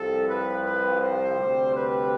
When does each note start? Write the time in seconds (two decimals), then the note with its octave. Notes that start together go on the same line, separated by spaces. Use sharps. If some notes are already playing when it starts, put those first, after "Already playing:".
Already playing: C2 C3 F3 C4 A4
0.27 B4
0.64 B4
1.01 C5
1.37 D2 C3 G3 C4
1.74 B4